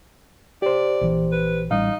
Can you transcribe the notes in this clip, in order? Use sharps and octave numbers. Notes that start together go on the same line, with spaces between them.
G4 C5 D5
A#1 E3
B4
A1 G3 D#4 F5